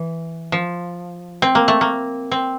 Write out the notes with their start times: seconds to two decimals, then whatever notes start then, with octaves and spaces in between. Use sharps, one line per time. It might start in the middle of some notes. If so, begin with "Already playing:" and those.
Already playing: E3
0.52 F3
1.42 C4
1.55 A#3
1.68 A3
1.81 A#3
2.31 C4